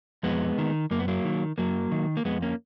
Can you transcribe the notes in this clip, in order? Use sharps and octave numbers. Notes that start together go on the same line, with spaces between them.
F2 G#3 B3
D#3
F#2 A#3
B3
F#3 A#3
D#3
F#2 F#3 A#3
D#3
A#3
F2 G#3 B3
A#3 C#4